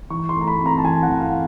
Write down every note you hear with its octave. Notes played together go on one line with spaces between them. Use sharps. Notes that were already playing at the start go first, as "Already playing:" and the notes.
E3 C#6
C6
A3
A#5
B5
C4
A#5
A5
E3 G#5
F#5
E3
F5